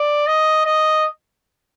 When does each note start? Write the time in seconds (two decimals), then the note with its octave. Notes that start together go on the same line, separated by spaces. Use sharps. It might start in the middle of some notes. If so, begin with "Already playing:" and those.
Already playing: D5
0.27 D#5
0.65 D#5